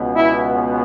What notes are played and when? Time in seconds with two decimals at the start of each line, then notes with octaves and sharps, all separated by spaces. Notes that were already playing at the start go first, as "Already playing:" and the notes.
Already playing: C#2 B2 B3
0.16 E4